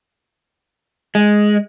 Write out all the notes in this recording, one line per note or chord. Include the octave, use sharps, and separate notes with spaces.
G#3